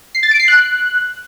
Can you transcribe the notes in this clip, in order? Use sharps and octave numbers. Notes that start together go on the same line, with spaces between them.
C7
A6
D7
C7
F#6